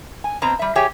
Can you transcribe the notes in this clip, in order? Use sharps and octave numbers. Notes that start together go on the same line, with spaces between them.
G#5
B2 C4 A#5
G3 E5
G4 G#4 C#5 E5 G5 G#5